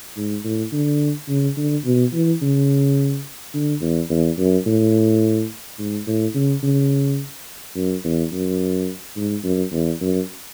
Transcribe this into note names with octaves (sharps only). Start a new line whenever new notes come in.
G#2
A2
D3
C#3
D3
B2
E3
C#3
D3
E2
E2
F#2
A2
G#2
A2
C#3
C#3
F#2
E2
F#2
G#2
F#2
E2
F#2